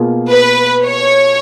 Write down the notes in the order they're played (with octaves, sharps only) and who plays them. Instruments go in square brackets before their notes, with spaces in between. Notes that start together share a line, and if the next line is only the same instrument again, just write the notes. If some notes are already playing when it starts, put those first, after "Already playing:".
Already playing: [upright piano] B2 A#3 F4 G#4
[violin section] B4
C#5